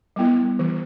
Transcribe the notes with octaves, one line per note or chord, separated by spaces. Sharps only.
G3 B3 E4
E3